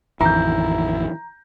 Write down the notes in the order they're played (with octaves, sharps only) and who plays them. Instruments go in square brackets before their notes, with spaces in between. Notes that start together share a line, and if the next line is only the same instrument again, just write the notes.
[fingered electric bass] A1 F2 D#3 [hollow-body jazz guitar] E3 [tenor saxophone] E4 [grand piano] A#5 G6